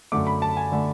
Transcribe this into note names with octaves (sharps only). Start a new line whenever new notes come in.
F#2 D3 A3 D6
B5
A5
G#5
D3 A3